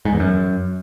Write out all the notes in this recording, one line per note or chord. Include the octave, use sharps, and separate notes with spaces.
G#2
E2
F#2